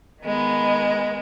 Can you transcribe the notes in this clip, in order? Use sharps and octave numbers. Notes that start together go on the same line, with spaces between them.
D#3 G#3 B3